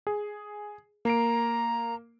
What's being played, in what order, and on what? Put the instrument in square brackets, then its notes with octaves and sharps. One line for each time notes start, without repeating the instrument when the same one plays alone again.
[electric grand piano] G#4
[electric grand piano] A#3 C7 D7 [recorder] A#5